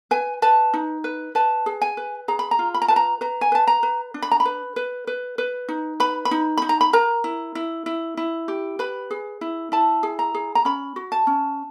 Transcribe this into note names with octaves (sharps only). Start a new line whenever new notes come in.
B4 G#5
B4 A5
D#4
B4
B4 A5
G#4
G#5
B4
G#4 A#5
B5
A#5
F4
B5
A#5
B4 A5
A#5
B4 A#5
G#5
B4 A5
A#5
B4
D4
B5
A#5
B5
B4
B4
B4
B4
D#4
B4 B5
B5
D#4
D#4 B5
A#5
B5
A#4 A#5
E4
E4
E4
E4
G4
B4 B5
G#4
E4
E4 A5
G#4
A#5
G#4
A#5
C#4 B5
F#4
A5
C#4